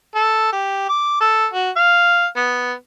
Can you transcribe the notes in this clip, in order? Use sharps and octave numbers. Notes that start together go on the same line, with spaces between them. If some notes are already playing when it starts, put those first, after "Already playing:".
A4
G4
D6
A4
F#4
F5
B3